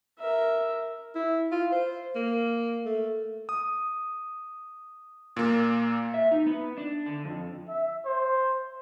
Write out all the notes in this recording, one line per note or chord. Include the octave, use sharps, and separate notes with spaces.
A#4 E5
E4
F4
C5
A#3
A3
D#6
A#2 A#3
E5
D#4
B3
D4
D3
F2
E5
C5